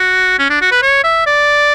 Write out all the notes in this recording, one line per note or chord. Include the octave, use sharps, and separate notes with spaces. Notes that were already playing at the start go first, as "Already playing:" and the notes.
Already playing: F#4
C#4
D4
F#4
B4
C#5
E5
D5